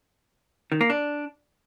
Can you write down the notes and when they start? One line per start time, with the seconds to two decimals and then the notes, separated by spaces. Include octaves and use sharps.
0.72 D#3
0.81 A#3
0.90 D4